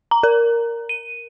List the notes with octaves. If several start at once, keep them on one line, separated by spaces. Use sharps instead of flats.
A#5
A#4
D#7